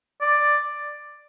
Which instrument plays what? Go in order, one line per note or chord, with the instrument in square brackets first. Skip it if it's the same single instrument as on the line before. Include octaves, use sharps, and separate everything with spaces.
[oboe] D5